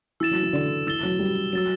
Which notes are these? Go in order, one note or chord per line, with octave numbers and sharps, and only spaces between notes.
E3 E6 A6 E7
F#3
E3
D3
E3 E6 A6 E7 G7
F#3
G3
F#3 E6 A6 E7